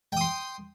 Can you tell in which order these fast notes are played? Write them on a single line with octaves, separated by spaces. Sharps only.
G5 D#6 C6